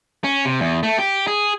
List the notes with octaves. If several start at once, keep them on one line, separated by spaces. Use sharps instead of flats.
C#4
C3
E2
A3
G4
G#4